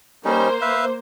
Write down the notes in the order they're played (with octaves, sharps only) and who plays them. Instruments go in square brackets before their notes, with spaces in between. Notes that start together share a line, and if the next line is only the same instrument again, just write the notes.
[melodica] G3 C#4 D#4 [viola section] A#3 C5
[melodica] B4 E5 F5